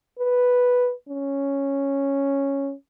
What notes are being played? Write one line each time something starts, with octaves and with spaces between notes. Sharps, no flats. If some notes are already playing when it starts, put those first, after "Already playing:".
B4
C#4